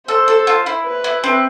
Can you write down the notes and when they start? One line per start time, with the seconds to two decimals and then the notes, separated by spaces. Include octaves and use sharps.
0.08 A4 C5
0.28 A4
0.47 F4
0.66 E4
0.86 B4
1.04 E4
1.24 C4